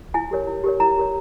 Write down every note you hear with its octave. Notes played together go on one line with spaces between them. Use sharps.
E4 G#5
G4 A#4 C#5
E4
G4 A#4 C#5
E4 A#5
G4 A#4 C#5